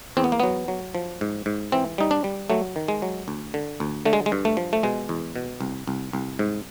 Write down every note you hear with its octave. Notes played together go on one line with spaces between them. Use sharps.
E2 C4
B3
A#3
F#3 B3
F#3
F3
G#2
G#2
E3 C4
G3 D#4
D4
G3
F#3 A3
D#3
G#3
F#3
D2
D3
D2
D3 A3
G#3
G#3
G2
A3
F3
A3
B2 G#3
E2
B2
C2
C2
C2
G#2